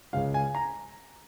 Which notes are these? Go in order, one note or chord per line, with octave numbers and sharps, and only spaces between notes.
C#2 C#3 G#3 F5
G#5
A#5